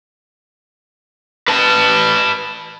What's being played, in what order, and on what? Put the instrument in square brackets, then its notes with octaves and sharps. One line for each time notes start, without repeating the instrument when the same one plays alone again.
[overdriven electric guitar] B4 A5